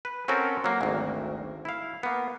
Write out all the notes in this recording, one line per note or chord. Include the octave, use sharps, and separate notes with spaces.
B4
C4 C#4 F#4 A4 A#4
F#3 A#3
G#1 D2
E4 F5
A#3 B3